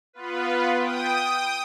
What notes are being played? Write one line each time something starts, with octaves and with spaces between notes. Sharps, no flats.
B3 F4 B4
G5 D#6